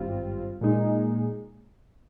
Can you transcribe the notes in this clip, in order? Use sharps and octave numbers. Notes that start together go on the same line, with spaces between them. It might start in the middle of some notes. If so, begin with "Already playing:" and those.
Already playing: G#1 G2 G3 C4 F4
A#2 G#3 D#4